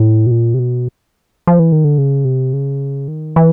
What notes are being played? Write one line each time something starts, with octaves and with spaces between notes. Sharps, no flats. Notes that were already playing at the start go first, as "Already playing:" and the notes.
Already playing: A2
B2
A#2
C3
B2
F3
E3
D#3
D3
C#3
C3
C#3
D#3
E3